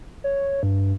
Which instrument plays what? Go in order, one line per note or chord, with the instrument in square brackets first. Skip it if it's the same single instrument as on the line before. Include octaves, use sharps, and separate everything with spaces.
[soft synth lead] C#5
G2